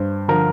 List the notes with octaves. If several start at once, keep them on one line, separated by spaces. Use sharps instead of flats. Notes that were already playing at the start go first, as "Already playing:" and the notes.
Already playing: G2 C5
D3 F3 A#4